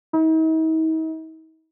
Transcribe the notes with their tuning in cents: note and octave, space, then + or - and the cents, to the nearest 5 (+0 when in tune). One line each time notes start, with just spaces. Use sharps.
D#4 +45